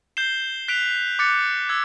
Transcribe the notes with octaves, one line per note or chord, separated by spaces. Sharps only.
G6 C7 E7 G7
F#6 B6 D7 F7
D6 F#6 A6 C#7
E6 G#6